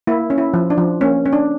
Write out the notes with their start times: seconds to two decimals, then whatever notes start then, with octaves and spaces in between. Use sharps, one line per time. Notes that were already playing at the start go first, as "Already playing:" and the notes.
0.07 A#3 E4
0.30 C#4
0.38 E4
0.54 F3
0.70 D4
0.78 F3
1.01 A#3 C#4
1.26 C#4
1.33 D4